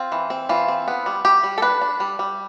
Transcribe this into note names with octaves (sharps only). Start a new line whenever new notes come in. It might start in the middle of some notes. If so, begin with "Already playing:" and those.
Already playing: C4 F4
E3
C4
E3 F4
C4
B3
G3
G3 G4
G3
A4
D4 B4
D4
G3
G3